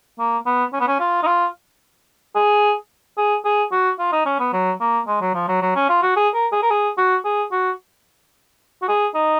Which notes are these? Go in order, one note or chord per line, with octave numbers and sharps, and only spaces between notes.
A#3
B3
C#4
B3
C#4
F4
D#4
F4
G#4
G#4
G#4
F#4
F4
D#4
C#4
B3
F#3
A#3
G#3
F#3
F3
F#3
F#3
C#4
F4
F#4
G#4
A#4
G#4
A#4
G#4
F#4
G#4
F#4
F#4
G#4
D#4